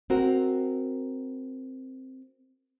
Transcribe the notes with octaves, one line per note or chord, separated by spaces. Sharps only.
C4 F#4 A#4